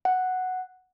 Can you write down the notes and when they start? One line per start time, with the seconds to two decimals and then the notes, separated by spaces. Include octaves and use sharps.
0.05 F#5